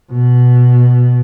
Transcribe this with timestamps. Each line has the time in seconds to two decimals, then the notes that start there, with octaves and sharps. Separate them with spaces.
0.12 B2